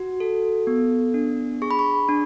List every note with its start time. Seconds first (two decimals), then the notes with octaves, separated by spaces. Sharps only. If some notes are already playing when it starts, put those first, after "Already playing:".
Already playing: F#4
0.20 A4
0.67 B3
1.14 D4
1.62 G#4 C#6
1.71 B5
1.79 C#6
2.09 D4